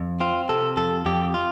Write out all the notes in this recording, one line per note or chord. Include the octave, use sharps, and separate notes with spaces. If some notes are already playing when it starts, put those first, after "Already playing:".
Already playing: F2
C4 F4
C3 A4
F2 A4
F2 G4
F4